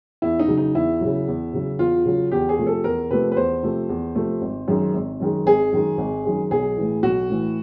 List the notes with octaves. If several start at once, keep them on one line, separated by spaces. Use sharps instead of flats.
E2 E4
D#4
C#3 F#3
D#4
E2 E4
C#3 F#3
E2
C#3 F#3
E2 F4
C#3 F#3
E2 G4
G#4
C3 F3 A3
A4
E2 A#4
C3 F3 A3 B4
B4
E2 C5
C3 F3 A3
E2
C3 F3 A3
G#1
F#2 D#3 G#3
G#1
F#2 D#3 G#3
G#1 G#4
F#2 D#3 G#3
G#1
F#2 D#3 G#3
B1 G#4
A2 E3
B1 F#4
A2 E3